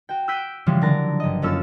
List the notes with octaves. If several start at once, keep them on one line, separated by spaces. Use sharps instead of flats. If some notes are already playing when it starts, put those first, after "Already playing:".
F#4 G5
E6 F#6 G6 B6 D7 D#7
C#3 E3 F3 G3 G#3 C#4
D3 F#3 A#4 A5 A#6
G1 D#5
F#1 F#2 C#4 F4 A4 E6